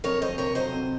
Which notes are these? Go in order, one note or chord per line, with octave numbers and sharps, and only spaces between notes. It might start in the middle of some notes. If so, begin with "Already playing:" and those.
F2 A#4 C#5
F2 C5 D#5
C3 A#4 C#5
F#3 C5 D#5
C3